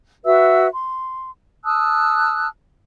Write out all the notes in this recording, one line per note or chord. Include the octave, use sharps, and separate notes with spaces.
F#4 B4 E5 E6
C6
A5 D#6 E6 F#6